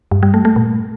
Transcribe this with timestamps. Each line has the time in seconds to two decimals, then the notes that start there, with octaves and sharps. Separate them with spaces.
0.11 G2
0.23 G3
0.34 A3
0.45 A3
0.56 A#2